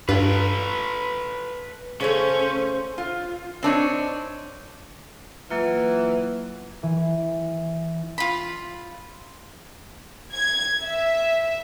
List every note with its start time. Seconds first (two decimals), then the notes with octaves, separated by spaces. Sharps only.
0.09 G2 F4 A4 B4
2.01 C#3 A3 C#4 C5
2.98 F4
3.63 C4 D4 D#4 C#5
5.51 E3 F#3 A#3 F4
6.83 E3
8.18 F4 B5
10.32 G#6
10.84 E5